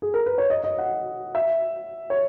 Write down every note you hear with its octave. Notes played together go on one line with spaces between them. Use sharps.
G#4
A#4
B4
C#5
D#5
D#5
F#5
E5
C#5